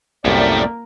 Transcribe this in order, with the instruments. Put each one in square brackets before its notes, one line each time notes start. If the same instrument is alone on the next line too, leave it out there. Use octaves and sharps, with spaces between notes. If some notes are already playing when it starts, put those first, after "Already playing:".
[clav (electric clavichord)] C2 F#2 [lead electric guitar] A2 A3 [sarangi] A#3 [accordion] D5 G5